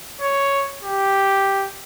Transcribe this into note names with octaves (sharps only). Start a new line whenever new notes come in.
C#5
G4